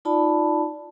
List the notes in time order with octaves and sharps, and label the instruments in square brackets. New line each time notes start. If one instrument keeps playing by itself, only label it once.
[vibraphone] D#4 F4 D5 A5 B5